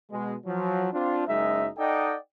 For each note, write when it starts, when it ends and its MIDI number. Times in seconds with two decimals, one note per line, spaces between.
0.10 0.34 47
0.10 0.34 56
0.46 0.88 53
0.46 0.88 54
0.93 1.25 60
0.93 1.25 62
0.93 1.25 65
1.27 1.68 30
1.27 1.68 42
1.27 1.68 56
1.27 1.68 63
1.27 1.68 76
1.78 2.16 63
1.78 2.16 69
1.78 2.16 74
1.78 2.16 75
1.78 2.16 78
1.78 2.16 79